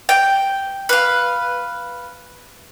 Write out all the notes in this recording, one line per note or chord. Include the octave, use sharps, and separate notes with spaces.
G5
B4 F5